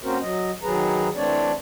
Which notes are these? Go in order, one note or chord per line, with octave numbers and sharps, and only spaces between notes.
A#3 C4 C#4 F#4 A#4 C5
F#3 D#5
D#3 F#3 G#4 B4 A#5
E3 A3 C4 D4 C#5 D5